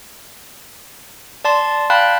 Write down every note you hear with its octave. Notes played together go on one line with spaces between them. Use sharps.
D5 A5 C6
F5 G5 A5 B5 F#6